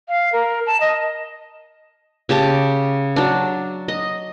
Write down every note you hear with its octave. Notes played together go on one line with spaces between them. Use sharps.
F5
A#4
A5
D#5
C#3 G4 A5 D6
F#3 D4
D#5